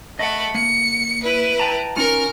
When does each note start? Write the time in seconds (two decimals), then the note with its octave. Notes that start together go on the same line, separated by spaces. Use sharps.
0.19 A3 D#5 F#5 B5
0.55 A#3 C#7
1.23 E4 B4
1.59 G5 A5 A#5
1.96 C#4 D#4 F4 A#4 F6